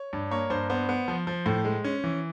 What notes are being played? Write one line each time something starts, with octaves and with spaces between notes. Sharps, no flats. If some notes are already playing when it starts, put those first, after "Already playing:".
Already playing: C#5
G2
A#3 C#5
G2 C5
B3 C5
B3
F3
F3
A2
G#3
C#4
E3